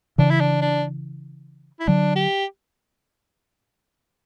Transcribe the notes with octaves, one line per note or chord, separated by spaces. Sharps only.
C#3 E3 D4
E4
D4
D4
E4
D3 F#3 D4
G4